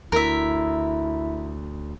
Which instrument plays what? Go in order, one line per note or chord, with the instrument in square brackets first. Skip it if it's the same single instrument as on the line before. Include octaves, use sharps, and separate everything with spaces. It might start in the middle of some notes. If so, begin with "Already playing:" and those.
[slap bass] D2 [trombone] E4 [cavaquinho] A#4 E5